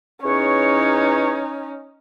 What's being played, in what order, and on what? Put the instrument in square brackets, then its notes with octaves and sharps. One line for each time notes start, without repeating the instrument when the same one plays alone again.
[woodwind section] E2 B4 C#5 [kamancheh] C#4 D#4